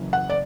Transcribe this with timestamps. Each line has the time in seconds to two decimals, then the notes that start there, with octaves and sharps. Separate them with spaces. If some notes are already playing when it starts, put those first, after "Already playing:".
Already playing: F#1 F#2 E3
0.13 F#5
0.30 D5